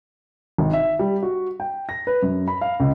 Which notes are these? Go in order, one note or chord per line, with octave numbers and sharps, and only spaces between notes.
G#1
E5
G3
F#4
G5
A#6
B4
F#2
B5
F5
C#2